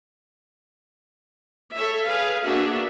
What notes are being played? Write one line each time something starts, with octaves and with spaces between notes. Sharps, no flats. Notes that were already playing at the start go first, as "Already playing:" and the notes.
A4 C#5 E5
G#4 B4 F5
A#3 B3 D4 F#4 G#4 E5